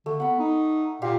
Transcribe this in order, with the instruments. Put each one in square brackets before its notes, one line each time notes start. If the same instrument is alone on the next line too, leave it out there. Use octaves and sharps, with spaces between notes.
[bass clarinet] D3 [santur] A3
[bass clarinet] B3 [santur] F#5 B5
[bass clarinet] D#4
[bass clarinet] A#2 [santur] F4 G4 F5